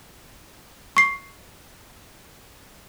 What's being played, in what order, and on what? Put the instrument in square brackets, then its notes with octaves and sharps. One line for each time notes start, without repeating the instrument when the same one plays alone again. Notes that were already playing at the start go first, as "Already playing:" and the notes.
[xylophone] C#6 C7